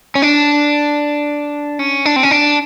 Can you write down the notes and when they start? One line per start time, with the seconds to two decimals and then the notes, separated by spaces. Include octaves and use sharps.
0.15 C#4
0.22 D4
1.79 C#4
2.06 D4
2.16 C4
2.23 C#4
2.31 D4